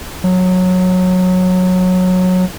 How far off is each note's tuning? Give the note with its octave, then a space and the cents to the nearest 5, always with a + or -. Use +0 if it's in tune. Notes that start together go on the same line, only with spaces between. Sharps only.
F#3 -15